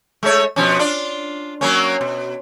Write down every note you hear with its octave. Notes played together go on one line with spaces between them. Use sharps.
G#3 A3 C#5
B2 F3 C#4
D4 F4 D5
F#3 A#3 C#4
B2